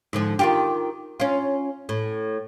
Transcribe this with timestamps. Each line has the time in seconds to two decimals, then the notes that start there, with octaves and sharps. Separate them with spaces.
0.13 G#2 D3 F3
0.39 D#3 F4 G4
1.20 C#4 F4
1.89 A2